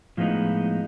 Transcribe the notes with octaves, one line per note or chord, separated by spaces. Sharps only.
A2 F3 G#3 B3 D#4